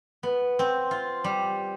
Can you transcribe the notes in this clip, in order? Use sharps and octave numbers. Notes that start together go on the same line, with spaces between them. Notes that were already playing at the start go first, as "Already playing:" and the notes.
B3
C4
F4
G3